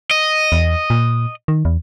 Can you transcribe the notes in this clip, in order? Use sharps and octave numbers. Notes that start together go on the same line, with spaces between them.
D#5
E2
A#2
D#3
E2